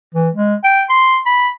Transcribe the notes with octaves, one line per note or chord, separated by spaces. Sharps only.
E3
G#3
G5
C6
B5